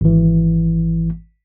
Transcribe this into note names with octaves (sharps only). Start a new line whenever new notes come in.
G#1 E3